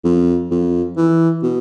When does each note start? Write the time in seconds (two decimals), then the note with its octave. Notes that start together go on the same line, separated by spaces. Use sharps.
0.04 F2
0.51 F2
0.97 E3
1.43 B2